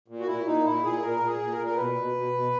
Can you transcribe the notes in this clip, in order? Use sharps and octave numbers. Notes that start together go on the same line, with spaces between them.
A#2
F#4
A#2 E4
A#2 D#4
A#2 E4
A#2 G#4
A#2 A#4
A#2
G#4
A#2
A#4
A#2
A#4
B2 B4
B2
B2
B2